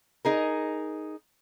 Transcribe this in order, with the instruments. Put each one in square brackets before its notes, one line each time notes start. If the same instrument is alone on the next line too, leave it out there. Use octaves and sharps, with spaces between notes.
[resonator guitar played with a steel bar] D#4 G#4 A#4